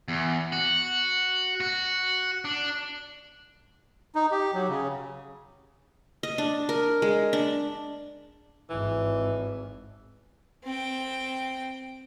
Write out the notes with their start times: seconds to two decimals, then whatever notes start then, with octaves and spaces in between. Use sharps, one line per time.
0.08 E2
0.52 F#4
1.61 F#4
2.45 D4
4.15 D#4
4.31 G4
4.54 F#3
4.69 C#3
6.23 D#5
6.38 D4
6.69 A#4
7.02 G#3
7.33 D4
8.70 G#1 G#2 E3
10.64 C4 G5